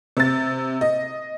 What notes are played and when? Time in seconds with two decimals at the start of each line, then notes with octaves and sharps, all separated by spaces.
0.17 C3 A6
0.81 D#5